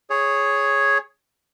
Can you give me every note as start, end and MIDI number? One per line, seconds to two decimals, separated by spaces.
0.10 0.98 68
0.10 0.98 73